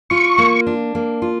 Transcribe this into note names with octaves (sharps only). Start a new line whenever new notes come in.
F4 C#6
A#3
D4
A#3
F4